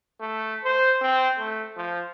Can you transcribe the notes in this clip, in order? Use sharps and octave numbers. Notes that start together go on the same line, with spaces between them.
A3
C5
C4
A3
F3